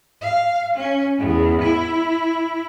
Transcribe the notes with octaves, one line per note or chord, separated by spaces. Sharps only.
F5
C#4
E2
E4